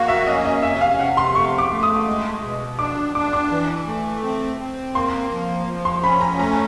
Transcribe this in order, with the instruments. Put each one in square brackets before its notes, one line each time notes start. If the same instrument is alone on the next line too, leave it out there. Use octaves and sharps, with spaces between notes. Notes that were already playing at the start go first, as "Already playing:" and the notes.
Already playing: [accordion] A#3 F#4 [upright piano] F5
[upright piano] E5
[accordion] C#4 [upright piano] D#5
[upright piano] D#5
[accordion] C3 [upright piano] E5
[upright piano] F5
[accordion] C3 [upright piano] F#5
[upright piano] C6
[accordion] A3 [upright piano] C#6
[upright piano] D6
[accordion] A3
[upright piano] D#6
[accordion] G#3
B2
[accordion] D4 [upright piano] D6
[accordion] D4 [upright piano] D6
[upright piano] D6
[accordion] E3
A3
C4
C4
[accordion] A#3 [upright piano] C6
[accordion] F3
F3
[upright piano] C6
[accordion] C#4 [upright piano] B5
[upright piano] A#5
[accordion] A3 [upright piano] A#5